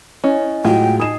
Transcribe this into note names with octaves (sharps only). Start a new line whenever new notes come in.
C#4 E4 D#5 G#5
A2 F#3 G#3 F4 F#4 G5
D#4 D#5 G#5 D#6 C7 E7